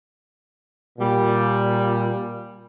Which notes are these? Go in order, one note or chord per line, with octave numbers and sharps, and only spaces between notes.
A#2 G3